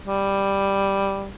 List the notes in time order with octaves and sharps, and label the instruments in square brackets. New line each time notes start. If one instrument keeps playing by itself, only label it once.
[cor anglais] G3